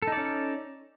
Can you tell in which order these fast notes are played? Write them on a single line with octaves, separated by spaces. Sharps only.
A4 D#4 D5 C#4